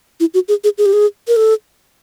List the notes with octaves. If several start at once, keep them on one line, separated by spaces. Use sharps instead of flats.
E4
F#4
G#4
G#4
G#4
G4
G#4
A#4
A4